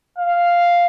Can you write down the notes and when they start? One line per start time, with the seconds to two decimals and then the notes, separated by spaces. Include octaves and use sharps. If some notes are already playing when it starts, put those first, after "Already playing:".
0.18 F5